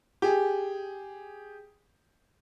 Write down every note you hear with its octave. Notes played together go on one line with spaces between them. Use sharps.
G4 G#4